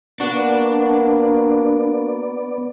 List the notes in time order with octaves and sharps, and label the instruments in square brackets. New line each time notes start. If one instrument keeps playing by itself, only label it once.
[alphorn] A#3 [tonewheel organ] B3 D5 [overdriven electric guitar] D4 [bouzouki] F#4